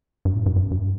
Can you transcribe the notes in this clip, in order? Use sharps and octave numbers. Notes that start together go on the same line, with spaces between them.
G2
A2
G2
G2
G2